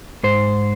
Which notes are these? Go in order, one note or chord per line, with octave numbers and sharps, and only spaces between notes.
G#2 C5